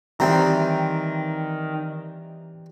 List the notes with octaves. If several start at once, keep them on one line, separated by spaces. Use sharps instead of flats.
D#3 E3 G3 C4 E5 G5 A#5